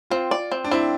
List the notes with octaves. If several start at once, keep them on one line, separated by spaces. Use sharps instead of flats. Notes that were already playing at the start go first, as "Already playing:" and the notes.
C4 F4
D5
C4
D4
C4 E4